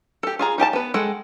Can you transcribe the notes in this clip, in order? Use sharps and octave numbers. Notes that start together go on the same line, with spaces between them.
G4 A4
F4 G#4 A#5
D#4 G4 G#5 A5
B3 B4
G#3 A4 F#5 G5